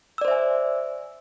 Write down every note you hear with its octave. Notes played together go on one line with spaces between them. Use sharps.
C5 D5 E5 G#5 E6